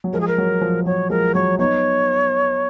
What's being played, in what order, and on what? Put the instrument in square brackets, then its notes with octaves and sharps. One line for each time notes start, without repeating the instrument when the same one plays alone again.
[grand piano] F#3
[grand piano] F3 G#3 [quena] A#4
[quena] G#4
A#4
[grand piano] F#3
F3
[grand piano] F#3 [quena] C#5
[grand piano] F3 G#3 [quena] A#4
[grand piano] F#3 [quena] C#5
[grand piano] B3 D#4 [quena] C#5